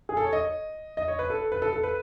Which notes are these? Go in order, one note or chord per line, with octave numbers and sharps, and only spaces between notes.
G#4
A4
C#5
D#5
D#5
C#5
B4
A4
B4
A4
A4
B4